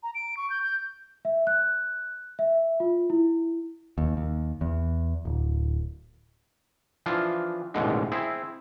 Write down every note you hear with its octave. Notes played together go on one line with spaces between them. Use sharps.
A#5
D7
C#6
G6
G6
E5
F#6
E5
F4
E4
D#2
D#2
E2
D1
E3 F3 D4 F4
A1 D#2 G#2 B2 D3 G#3
C4 E4 G#4